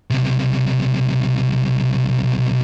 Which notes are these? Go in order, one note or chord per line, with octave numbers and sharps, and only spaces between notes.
B1 C3